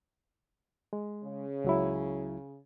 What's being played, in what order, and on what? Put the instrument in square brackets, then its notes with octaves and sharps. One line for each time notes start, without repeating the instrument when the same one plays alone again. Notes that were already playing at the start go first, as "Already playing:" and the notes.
[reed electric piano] G#3
[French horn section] C#3
[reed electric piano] C#2 F#3 E4